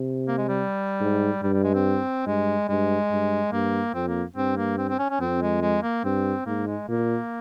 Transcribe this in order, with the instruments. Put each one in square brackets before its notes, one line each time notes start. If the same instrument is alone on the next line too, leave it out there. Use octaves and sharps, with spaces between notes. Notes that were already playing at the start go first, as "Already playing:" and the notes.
Already playing: [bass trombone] C3
[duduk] A#3
G#3
G3
[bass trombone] G#2
[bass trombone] G2 [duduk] G3
[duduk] G3
G#3
C4
[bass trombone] G2 [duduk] G#3
[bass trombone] G2 [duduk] G#3
[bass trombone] G2
[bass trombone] G2 [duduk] A#3
[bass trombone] F2 [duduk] C4
[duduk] A#3
[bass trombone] G2 [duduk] C4
[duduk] A#3
C4
C4
C#4
C#4
[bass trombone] F2 [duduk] C4
[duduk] G#3
G#3
A#3
[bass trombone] G2 [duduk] C4
[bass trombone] G#2 [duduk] A#3
[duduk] G#3
[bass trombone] A#2 [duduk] A#3